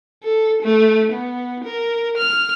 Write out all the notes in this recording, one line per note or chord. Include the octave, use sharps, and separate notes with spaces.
A4
A3
B3
A#4
F6